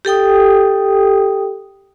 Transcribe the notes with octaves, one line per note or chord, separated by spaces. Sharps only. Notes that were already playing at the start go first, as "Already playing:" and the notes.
G4 A4 G5 D#6